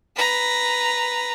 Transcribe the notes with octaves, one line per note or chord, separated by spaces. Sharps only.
B4 A#5